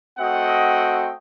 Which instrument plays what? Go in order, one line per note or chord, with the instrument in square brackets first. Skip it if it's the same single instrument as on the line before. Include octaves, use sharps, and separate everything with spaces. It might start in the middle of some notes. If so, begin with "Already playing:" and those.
[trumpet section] A3 C4 F#4 D#5 F#5 G5